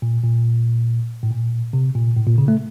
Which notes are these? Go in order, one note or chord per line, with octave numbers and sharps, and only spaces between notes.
A#2
A#2
A2
A#2
C3
A#2
A2
A#2
C#3
A3